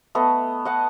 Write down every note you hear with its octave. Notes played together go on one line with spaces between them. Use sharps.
A3 B3 A4 D#5
D#5 F#5 A5